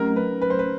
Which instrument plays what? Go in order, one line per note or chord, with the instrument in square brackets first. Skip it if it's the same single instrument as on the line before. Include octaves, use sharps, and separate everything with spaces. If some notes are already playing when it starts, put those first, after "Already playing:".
Already playing: [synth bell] F#3 A3 C#4 [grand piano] A#4
[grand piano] B4
B4
C5
B4